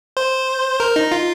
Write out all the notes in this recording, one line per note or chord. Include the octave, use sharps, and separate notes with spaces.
C5
A#4
D#4
F4